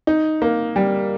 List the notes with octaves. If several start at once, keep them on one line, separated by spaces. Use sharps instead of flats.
D#4
A#3
G3